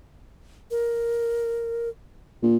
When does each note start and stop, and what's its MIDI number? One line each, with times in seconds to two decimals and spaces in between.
0.71 1.89 70
2.43 2.57 46